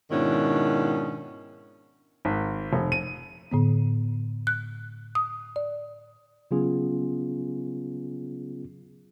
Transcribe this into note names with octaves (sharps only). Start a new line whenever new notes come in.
G#2 B2 D#3 C#4 D4 E4
G#1
F1
D#7
A2 D3 B3
F#6
D#6
D5
C#3 F#3 B3 C#4 F4 G#4